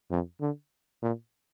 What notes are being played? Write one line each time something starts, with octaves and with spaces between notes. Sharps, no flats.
F2
D3
A#2